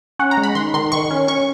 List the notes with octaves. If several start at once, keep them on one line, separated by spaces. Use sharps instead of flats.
C#4 F#5
A#5
G#3
B5
D#3 C6
D#3 C6
D#3 C#6
C#4
C#4 C#6